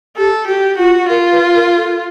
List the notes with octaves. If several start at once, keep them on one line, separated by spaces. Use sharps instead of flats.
G4 A4
F#4 G4
F4 F#4
F4 A#4
B4
A#4
A4